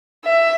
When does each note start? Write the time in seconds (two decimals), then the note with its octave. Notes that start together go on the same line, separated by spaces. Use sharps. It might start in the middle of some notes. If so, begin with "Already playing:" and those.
0.24 E5